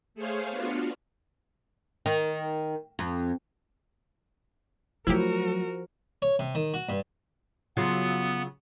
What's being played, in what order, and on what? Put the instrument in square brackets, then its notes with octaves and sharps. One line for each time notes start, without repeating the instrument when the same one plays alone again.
[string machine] A3 G#4 C5 C#5 F5
B3 D4 F4 F#4
[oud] D#3
F2
[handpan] F3 [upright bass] F#3 A3 [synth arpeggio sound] E4 G4 [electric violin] F#4 A#4
[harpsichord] C#5
C3
D#3
F#4
G2
[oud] C#3 F#3 F4 [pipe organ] B3